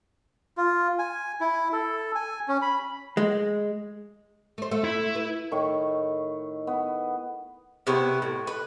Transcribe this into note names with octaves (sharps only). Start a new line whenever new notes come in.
F4
G#5
E4
A4
G#5
C#4
B5
G#3
A3 C5
A3
E4
B4
A2 D#3 C#6
B3
C3 B3 E4 C#5
A2
B4